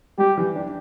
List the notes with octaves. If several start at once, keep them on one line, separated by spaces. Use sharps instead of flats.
G3 G4
E3
D4